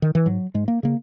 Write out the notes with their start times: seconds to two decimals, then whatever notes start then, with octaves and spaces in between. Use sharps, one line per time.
0.02 D#3
0.15 E3
0.26 G#2 F#3
0.54 G#2 G#3
0.68 A#3
0.83 C#3 A#3